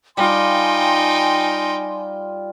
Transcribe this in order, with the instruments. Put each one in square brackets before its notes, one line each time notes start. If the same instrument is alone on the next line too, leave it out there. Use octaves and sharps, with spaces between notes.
[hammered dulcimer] G3 F4 [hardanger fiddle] D#4 G5 [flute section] G#5 C6